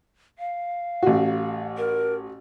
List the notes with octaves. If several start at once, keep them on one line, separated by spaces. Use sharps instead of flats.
F5
A1 F#4
A#4